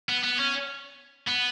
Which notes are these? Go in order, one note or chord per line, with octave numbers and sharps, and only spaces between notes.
B3
B3
C#4
B3